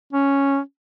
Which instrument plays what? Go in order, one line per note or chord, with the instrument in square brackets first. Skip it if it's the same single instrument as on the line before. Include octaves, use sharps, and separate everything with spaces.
[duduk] C#4